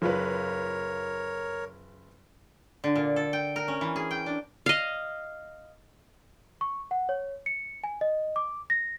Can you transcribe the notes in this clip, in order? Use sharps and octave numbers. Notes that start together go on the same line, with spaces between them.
F#1 F4 A#4 B4 C#5
D3
A#2
A4
G5
A#4
C#4
E3
G#4
G5
D4
D#5 F5
C#6
F#5
C#5
C#7
G#5
D#5
D6
A#6